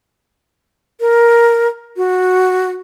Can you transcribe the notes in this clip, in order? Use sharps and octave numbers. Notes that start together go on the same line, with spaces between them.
A#4
F#4